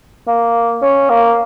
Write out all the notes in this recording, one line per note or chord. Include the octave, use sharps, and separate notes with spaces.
A#3
C#4
A#3